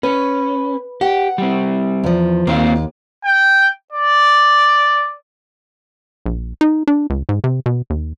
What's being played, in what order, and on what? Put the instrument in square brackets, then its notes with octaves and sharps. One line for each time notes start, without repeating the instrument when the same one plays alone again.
[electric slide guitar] C#4 [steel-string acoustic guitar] B4
[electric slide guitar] G4 [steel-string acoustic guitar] F#5
[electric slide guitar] G3 C4
[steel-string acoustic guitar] E2 F3
[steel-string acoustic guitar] D#2 [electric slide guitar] A#3 C4 F4
[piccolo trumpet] G5
D5
[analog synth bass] A#1
D#4
D4
C#2
G#2
C3
B2
D#2